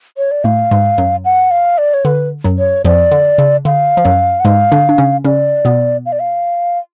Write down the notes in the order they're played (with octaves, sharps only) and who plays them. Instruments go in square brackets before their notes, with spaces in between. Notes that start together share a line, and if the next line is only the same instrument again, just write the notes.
[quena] C#5
D5
[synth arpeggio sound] A2 A3 [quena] F5
[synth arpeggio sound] G#2 G#3
F#2 F#3
[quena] F#5
F5
D5
C#5
[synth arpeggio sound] D3 [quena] B4
[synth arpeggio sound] F#2 F#3
[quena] C#5
[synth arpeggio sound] F2 F3 [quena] D5
[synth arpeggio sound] D3
C#3
[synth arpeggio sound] D3 [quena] F5
[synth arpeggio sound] F3
F#2 F#3
[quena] F#5
[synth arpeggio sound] G#2 G#3 [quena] F5
[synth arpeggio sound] D3 D4
D4
C#3 C#4
[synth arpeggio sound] C#3 C#4 [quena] D5
[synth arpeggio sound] B2 B3
[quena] F5
D5
F5